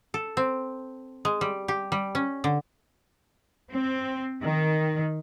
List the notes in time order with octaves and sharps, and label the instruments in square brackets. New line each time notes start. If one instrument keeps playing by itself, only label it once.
[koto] A4
C4
G#3
G3
G4
G3
C#4
D3
[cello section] C4
D#3